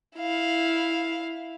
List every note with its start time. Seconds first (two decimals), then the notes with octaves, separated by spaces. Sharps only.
0.17 E4 F5